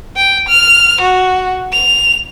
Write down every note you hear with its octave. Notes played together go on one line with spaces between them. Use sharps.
G5
F6
F#4
F7